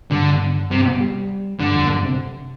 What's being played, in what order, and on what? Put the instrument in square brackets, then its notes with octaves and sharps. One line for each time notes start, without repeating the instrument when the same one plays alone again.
[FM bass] G2 [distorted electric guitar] D3
[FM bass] G2 [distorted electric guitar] C3
[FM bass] G3
[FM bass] G2 [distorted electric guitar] D3
[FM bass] F2
A#2
G2
C3